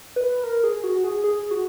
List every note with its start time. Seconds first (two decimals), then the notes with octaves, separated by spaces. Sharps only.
0.16 B4
0.43 A#4
0.64 G#4
0.84 F#4
1.04 G#4
1.24 G#4
1.51 F#4